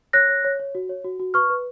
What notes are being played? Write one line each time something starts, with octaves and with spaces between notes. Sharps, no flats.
C#5 F#6 A#6
C#5
C#5
C#5
F#4
C#5
F#4
F#4
B4 C#6 F6
B4